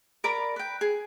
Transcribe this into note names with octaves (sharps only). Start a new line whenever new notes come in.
A#4 D5 A#5 B5
B4 G5
G#4